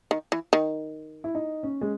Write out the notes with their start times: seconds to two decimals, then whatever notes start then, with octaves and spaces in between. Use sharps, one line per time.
0.11 D#3
0.32 E3
0.53 D#3
1.24 E4
1.35 D#4
1.63 C#4
1.81 G#3